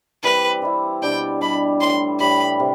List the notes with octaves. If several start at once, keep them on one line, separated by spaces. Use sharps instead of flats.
E3 G3 C4 E4 B4
E3 G3 C4 E4
B2 G3 D4 G5
B2 G3 D4 B5
A2 E3 G3 C6
A2 E3 G3 B5
C3